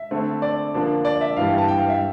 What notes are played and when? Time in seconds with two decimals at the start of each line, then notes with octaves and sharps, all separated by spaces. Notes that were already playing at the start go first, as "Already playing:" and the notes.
Already playing: E5
0.11 D3 A3 C4
0.42 D5
0.74 D3 F3 A#3 D4
1.05 D5
1.21 E5
1.37 G2 E3 G3 F5
1.47 G5
1.58 A5
1.68 G5
1.78 F5
1.88 E5